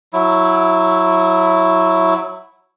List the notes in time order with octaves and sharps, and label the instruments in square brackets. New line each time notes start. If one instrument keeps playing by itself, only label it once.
[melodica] F#3 E4